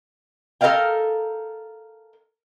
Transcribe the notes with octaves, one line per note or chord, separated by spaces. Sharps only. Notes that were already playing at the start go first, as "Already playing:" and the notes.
A4 A#4 C#5 D#5 F5 G5